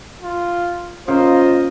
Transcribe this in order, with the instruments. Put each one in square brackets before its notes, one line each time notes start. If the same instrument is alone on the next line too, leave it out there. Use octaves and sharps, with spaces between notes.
[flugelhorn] F4
[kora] C#3 A#3 [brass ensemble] F4 D#5 [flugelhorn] C5